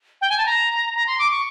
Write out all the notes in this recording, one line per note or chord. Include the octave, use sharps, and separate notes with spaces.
G5
G#5
A5
A#5
A#5
C6
D6
C#6